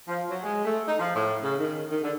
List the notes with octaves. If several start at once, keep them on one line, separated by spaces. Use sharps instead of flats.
F3
F#3
G#3
A3
D#4
F3
A2
C#3
D#3
D#3
D3